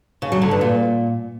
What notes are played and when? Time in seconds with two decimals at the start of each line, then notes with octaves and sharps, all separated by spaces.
0.22 C#3
0.32 F#3
0.42 D3
0.51 G2
0.61 A#2